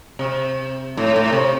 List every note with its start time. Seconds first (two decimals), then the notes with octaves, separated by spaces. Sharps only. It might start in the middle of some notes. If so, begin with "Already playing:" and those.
0.19 C3
0.97 A2
1.16 A2
1.33 C3